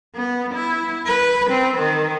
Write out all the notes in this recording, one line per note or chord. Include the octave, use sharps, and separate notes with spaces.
B3
E4
B4
C4
D#3